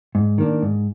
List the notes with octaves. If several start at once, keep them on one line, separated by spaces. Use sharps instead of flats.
G#2
D#3 A#3 D4
G#2